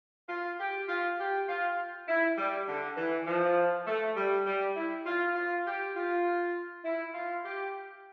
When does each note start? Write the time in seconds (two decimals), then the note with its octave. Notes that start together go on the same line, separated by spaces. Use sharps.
0.29 F4
0.60 G4
0.89 F4
1.19 G4
1.49 F4
2.08 E4
2.38 G3
2.69 D3
2.97 E3
3.27 F3
3.87 A3
4.17 G3
4.47 G3
4.77 E4
5.06 F4
5.36 F4
5.67 G4
5.96 F4
6.85 E4
7.15 F4
7.45 G4